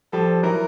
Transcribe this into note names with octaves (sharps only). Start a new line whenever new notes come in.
F3 G3 A4
E3 F#3 A#4